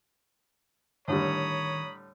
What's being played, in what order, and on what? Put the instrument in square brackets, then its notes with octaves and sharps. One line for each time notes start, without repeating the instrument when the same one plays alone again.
[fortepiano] A2 D3 G3 [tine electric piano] D#3 [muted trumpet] C#5 [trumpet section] A#5 B5 D#6